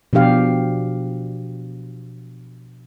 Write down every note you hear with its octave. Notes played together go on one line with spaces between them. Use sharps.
B2 F3 D4 G4 F5